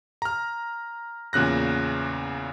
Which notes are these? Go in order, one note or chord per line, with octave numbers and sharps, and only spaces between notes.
A#5 F6
E2 A#2 C#3 F#6 A#6